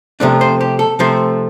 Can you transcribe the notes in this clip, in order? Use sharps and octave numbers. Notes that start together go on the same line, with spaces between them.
C3 F3 A3 D4
C5
G4
A4
C3 F3 A3 C5